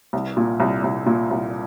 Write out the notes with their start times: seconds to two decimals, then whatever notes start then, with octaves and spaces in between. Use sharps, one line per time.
0.13 C2
0.37 A#2
0.60 C2
0.84 C2
1.06 A#2
1.31 C2